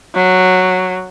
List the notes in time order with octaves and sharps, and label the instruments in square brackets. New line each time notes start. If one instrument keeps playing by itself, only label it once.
[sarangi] F#3